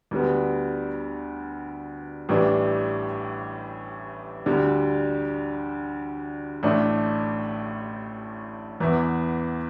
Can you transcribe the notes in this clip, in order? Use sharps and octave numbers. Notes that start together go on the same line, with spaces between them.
D2 D3 G3 B3
A1 A2 E3 G3 D4
D2 D3 G3
A1 A2 A3 D4
E2 E3 B3 E4